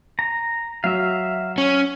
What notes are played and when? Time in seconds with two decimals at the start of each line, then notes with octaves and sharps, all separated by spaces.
0.19 A#5
0.84 F#3 E5 F5
1.58 C#4